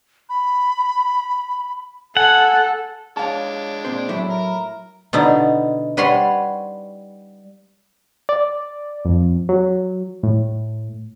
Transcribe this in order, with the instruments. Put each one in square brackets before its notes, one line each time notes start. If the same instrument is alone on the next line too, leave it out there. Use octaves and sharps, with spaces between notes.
[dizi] B5
[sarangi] A4 [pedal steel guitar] F#5 [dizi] G#5
[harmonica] G#3 D4 [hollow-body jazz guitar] C#5 F5 A5
[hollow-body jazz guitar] A#2 C4 C5
[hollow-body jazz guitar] A2 F#3 A3 [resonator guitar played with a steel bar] E4
[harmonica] A#4 A#5
[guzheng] B2 D3 D#4 E4
G3 B4 C#5 F#5 C6
[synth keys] D5
F2
F#3
A2